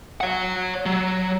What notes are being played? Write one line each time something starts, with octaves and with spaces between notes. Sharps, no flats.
C#5 F#5
F#3